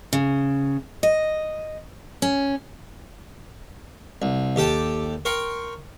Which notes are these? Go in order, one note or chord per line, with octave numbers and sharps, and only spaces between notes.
C#3
D#5
C#4
C2
D#2 G4 A4 G5 A5
A#4 G5 C6 C#6